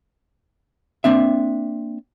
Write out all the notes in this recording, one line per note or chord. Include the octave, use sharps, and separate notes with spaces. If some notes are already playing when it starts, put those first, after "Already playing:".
A#3 C4 D4 E5